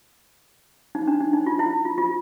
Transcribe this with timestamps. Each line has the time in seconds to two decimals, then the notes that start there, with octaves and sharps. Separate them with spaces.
0.95 D#4
1.08 D4
1.20 D#4
1.33 D#4
1.46 F4
1.59 E4
1.85 F4
1.98 F4